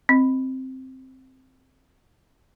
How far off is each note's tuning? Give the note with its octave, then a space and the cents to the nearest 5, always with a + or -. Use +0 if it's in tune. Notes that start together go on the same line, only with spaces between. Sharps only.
C4 +0 D#5 +0